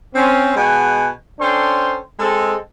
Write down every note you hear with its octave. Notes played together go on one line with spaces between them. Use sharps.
C4 C#4
B2 G#3 F#5 G#5
C#4 D4 A4 C5 G5 C6
G#3 C4 A4